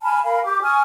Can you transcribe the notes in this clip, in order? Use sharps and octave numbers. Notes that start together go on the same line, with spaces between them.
G#5 A5 B5 F6
A#4 F5 G#5 B5
G4 D6
G#5 C#6 D#6 F6